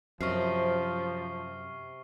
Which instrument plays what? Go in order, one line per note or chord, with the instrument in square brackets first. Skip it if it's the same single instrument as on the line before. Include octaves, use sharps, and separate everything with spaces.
[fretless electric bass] F#2 [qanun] C3 D#5 [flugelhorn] F3 [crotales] C#6 F6 C7